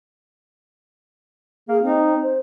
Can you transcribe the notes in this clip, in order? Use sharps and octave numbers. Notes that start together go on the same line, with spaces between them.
A#3 G#4
C4 D#4
C5